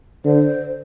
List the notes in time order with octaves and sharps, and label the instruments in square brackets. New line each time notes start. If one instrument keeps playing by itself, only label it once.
[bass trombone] D3 [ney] C5